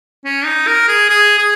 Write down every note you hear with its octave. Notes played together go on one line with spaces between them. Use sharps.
C#4
D#4
A#4
G#4
G#4
G#4